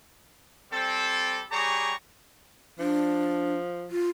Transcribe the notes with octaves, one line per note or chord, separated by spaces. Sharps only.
G3 C4 A4
G3 G4 G#4 C#5 A#5 C#6
F3 D4
F4